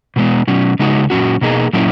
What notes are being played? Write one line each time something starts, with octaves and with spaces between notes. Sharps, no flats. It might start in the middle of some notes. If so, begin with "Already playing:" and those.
B2 G#3 B3
B2 F#3 C#4
C#3 G#3 D#4 F#4
A#2 F#3 C#4 F#4
B2 A#3 D#4 G#4
A#2 F#3 A#3 C#4 E4